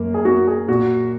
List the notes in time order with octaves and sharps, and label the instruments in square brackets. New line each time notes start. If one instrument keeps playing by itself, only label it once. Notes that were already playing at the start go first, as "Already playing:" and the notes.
Already playing: [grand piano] F#2 A#3
[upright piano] G#4
[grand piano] A#3 [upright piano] F#4
[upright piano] G#4
[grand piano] A#2 [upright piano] F#4